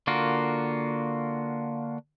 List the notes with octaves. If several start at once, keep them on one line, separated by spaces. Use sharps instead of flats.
D3 A#3 F4 F#4 A#4